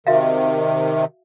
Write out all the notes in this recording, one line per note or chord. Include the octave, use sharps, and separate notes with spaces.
C3 D#3 F#4 E5 F5